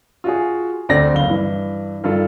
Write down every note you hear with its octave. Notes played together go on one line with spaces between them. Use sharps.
F4 F#4 G#4
D2 C4 A4 D5 A#6
F#1 F5 G7
G2 E3
G2 D#3 F4 A4